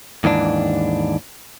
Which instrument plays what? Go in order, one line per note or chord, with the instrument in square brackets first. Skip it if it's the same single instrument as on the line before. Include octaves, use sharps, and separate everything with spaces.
[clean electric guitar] D#2 G#2 E3 D4